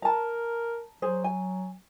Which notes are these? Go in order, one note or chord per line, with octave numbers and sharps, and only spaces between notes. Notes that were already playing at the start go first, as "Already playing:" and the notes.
A#4 A5 A#5
F#3 G#4 C5
G#5